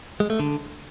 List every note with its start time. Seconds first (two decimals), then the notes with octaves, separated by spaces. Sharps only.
0.20 G#3
0.30 A3
0.40 D3